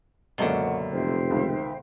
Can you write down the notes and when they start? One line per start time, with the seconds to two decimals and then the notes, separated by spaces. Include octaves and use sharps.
0.38 C#2 F#2 B2 D3 A#3 F#5 C#6
0.92 F1 C5 E5 G5
1.30 C#2 D#3